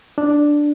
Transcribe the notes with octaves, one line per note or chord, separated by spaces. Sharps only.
D4